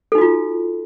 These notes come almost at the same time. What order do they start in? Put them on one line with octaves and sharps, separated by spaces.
A4 D#4 F#4 F4